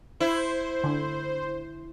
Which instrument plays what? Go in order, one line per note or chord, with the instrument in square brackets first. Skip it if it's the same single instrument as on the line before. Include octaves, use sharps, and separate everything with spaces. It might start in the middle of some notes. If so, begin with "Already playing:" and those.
[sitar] E4 [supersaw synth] C5
[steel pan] D3